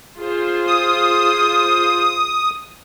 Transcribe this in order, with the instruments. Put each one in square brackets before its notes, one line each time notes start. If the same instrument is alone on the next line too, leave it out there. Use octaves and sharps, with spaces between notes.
[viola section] F4 G#4 C5
[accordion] D#6